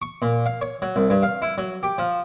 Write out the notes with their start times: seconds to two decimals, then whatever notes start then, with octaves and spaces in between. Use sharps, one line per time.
0.02 C#6
0.22 A#2
0.46 F5
0.61 C#5
0.82 F#3
0.96 C2
1.10 G2
1.23 F5
1.42 E4
1.58 F#3
1.83 G4
1.98 F3